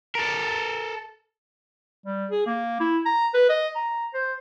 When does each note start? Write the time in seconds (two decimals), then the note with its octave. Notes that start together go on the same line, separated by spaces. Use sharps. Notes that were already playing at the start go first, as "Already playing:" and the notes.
0.15 A4 A#4
2.06 G3
2.31 G#4
2.47 A#3
2.80 E4
3.05 A#5
3.34 B4
3.49 D#5
3.75 A#5
4.14 C5